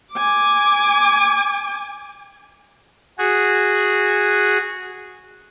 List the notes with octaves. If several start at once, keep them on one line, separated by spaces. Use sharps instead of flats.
G#5 D6
F#4 G#4